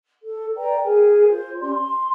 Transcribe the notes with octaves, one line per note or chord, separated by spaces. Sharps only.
A4
B4 D5 G5 A#5
G#4 A#4 G#5
F4 C5
C#4 G4 D5 C6
C6